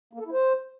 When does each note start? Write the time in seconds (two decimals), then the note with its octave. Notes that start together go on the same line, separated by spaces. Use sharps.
0.13 A#3
0.20 A4
0.26 E4
0.32 C5